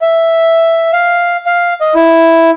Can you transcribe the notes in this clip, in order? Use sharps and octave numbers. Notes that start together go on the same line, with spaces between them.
E5
F5
F5
D#5
E4